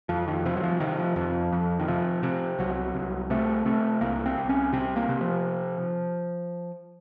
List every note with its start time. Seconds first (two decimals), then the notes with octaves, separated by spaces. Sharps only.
0.09 F2 F3
0.28 D#3
0.45 C3 F3
0.56 F#3
0.63 F3
0.80 C3 D#3
0.99 F3
1.16 F2 F3
1.52 F2
1.80 D#3
1.88 C3 F3
2.23 C3
2.59 C2 F#3
2.95 C2
3.30 C3 A3
3.66 C3 A3
4.01 C2 A#3
4.26 C4
4.38 C2
4.49 C#4
4.73 C3 C4
4.96 A#3
5.09 C3
5.21 F3